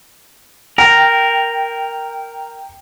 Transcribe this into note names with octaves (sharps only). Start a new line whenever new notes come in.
A#4 G5